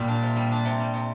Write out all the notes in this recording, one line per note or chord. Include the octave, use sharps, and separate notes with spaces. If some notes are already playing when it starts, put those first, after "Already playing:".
Already playing: A#2 G3
D4
C3
G3
D4
C3
G3
C3